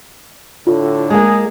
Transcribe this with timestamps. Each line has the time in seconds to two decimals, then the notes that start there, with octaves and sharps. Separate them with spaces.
0.67 A2 D3 F4
1.10 G#3 A#3 G#4